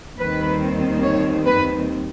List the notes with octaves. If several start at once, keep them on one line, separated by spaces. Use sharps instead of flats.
D#2 D#3 G3 C4 B4
C#5
B4